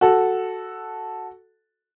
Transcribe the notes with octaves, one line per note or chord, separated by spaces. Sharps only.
F#4 A4